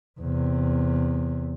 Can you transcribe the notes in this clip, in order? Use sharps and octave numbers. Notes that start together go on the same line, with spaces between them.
E2 C3